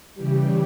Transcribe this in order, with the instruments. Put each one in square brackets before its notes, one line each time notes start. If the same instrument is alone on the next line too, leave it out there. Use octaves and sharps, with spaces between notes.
[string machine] C#3 E3 G3 G4